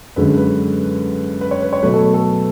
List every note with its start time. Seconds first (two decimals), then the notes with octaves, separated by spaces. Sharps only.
0.16 F#2 D3 G#3 B4
0.37 B4
1.41 B4
1.51 C#5
1.62 B4
1.73 C#5
1.83 B2 F#3 A3 B4
1.93 A4
2.14 A4